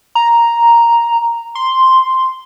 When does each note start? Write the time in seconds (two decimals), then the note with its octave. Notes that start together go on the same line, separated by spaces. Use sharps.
0.15 A#5
1.55 C6